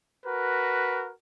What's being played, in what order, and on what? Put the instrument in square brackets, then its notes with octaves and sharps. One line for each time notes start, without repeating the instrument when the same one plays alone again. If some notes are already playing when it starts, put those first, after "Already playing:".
[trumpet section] F#4 A#4 B4